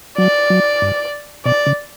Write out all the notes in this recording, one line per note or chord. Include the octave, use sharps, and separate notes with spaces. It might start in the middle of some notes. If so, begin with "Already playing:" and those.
F#3 D5
F#3
G2
B2 D5
C#3